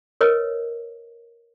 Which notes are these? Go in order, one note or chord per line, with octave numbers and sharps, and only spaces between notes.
A#4 B4 C#5 D#5